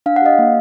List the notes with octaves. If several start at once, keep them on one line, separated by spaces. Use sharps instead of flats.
D4 F5
F#5
G4 D#5 F5
A#3